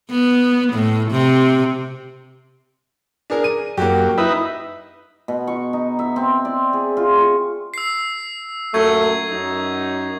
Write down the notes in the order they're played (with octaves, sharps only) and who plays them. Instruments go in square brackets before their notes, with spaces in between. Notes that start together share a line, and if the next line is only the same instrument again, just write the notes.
[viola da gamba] B3
A2
C3
[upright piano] D4 G#4 A#4
D#7
[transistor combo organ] F#2 [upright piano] A#3 F#4 G4
[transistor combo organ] D#4 B4 E5 [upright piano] E4
[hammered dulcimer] B2
C#6
D#4
E5
C4
D5
G#4
F4
C#6
[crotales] E6 C7
[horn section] F#2 A#2 A3 [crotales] C#6 G#6
[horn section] F#2 D#4